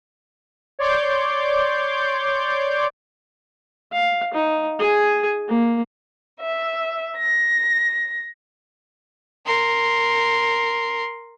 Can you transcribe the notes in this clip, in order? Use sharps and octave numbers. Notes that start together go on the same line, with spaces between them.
C#5 D5 C6 D6 G6
F5
D#4
G#4 G#5
A#3
E5
A#6
A#4 C6